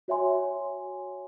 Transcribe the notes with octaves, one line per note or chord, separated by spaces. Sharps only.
F#4 C#5 E5 G#5 C6